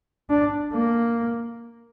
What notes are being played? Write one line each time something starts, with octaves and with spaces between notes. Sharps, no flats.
D4
A#3